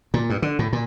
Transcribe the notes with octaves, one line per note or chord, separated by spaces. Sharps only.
A#2
G2
D3
A2
A#2